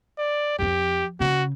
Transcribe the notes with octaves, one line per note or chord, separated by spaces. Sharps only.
D5
F2 F3 G4
C#3 F#4